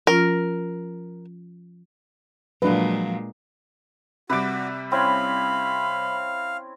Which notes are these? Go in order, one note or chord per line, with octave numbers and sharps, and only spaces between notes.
F3 C#4 F4 A#4
A#2 F3 F#3 G#3 D4 B4
C3 G3 F#4 B4 D6
C4 C#4 E4 F5 B5